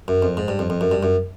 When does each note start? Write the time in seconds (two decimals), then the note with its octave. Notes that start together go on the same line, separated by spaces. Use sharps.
0.08 F#2
0.22 F2
0.37 G#2
0.48 G2
0.59 F2
0.70 F2
0.81 F#2
0.92 G2
1.03 F#2